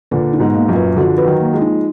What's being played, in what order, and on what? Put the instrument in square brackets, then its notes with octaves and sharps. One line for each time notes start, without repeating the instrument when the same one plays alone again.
[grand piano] A#2 D3 [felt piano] B4
[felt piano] D#4
[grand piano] G#2 B2
[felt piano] A#3
[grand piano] F#2 A#2
[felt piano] B4
[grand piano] D3 F3 [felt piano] F#4
[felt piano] B4
[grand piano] D#3 F#3
[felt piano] A#3
[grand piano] F3 G#3
[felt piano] D#4